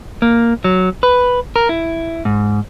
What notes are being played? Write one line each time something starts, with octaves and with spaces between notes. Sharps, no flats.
A#3
F#3
B4
A#4
E4
G#2